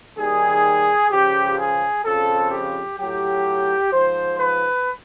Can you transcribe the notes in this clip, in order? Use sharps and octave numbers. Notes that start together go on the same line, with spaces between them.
D#2 D#3 G3 G#4
C#2 C#3 F3 G4
G#4
F2 C#3 F3 A4
G4
A2 F#3 G4
G#2 F3 C5
B4